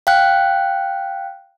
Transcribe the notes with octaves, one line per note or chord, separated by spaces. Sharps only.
F5 G5 F#6